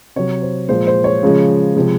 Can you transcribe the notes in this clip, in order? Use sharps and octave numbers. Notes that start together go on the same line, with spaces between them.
C3 F#3 C#5
C5
A#2 F3 G#3 C5
C5
C#5
C#3 F3 G#3
C3 F3 G#3